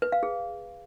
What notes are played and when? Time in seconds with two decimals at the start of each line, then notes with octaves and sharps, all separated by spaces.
0.02 B4
0.12 F5
0.23 G#4